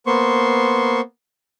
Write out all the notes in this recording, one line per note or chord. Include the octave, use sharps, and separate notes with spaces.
A#3 B3 C5 C6 C#6